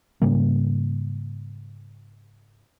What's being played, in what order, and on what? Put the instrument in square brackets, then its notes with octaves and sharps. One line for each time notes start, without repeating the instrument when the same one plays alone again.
[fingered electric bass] G#2 C#3 G3 A#3